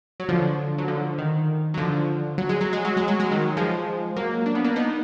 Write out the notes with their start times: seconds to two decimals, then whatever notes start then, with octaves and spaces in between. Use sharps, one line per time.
0.20 F#3
0.29 D3 F3
0.78 F#3
0.88 D3 F3
1.18 D#3
1.74 F#3
1.77 D3 F3
2.38 F#3
2.49 G#3
2.61 F#3
2.73 G#3
2.85 F#3
2.97 G#3
3.08 F#3
3.20 G#3
3.31 D#3 F#3
3.57 F3 G#3
4.16 F#3 A#3
4.46 D4
4.55 B3
4.64 A#3 D4
4.76 B3 D#4